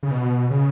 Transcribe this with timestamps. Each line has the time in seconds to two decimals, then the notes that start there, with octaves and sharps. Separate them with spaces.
0.03 C#3
0.11 B2
0.50 C#3